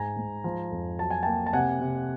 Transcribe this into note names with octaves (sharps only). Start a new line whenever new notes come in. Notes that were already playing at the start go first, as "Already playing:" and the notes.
Already playing: G#2 G#5 A#5
G#2
F3
F2
F#3 A5
G#5
A#3 G5 A5
A5
C3 F#5 G#5
C3